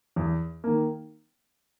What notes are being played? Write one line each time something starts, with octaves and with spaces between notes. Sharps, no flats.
E2
D#3 A#3